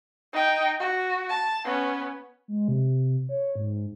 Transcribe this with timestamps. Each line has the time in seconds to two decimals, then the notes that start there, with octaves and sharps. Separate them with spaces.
0.33 D#4 G5
0.80 F#4
1.30 A5
1.65 B3 C#4
2.48 G#3
2.68 C3
3.29 C#5
3.55 G#2